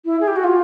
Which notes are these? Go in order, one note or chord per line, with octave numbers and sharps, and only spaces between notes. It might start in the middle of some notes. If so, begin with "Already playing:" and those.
E4
G#4
G4
F#4
F4